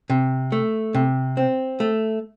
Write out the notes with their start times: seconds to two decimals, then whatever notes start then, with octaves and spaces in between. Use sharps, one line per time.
0.10 C3
0.52 A3
0.94 C3
1.37 C4
1.80 A3